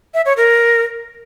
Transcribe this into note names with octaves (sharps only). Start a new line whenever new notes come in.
E5
C#5
A#4